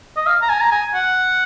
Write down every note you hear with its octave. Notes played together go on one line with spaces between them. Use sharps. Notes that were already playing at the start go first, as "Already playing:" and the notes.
D#5
F5
A#5
G#5
A#5
G#5
F#5